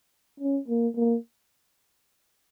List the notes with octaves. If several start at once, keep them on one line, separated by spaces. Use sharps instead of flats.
C#4
A#3
A#3